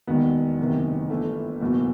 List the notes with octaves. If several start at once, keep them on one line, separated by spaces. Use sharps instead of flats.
E1 D#2 D#3 B3
F#1 E2 C3 D#3
G1 G2 E3 A3
F#1 E2 B2